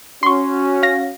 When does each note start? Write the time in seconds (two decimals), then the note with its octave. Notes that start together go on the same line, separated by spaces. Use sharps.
0.23 C#4 F#4 C6 C#6
0.83 F5 A#6